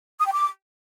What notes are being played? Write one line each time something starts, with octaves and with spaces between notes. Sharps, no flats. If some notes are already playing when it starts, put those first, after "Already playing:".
D#6
G5
D6